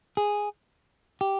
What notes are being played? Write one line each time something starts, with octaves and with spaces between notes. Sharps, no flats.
G#4
G4